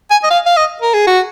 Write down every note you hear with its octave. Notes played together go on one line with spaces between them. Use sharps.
G#5
D#5
F5
F5
D#5
A#4
G#4
F#4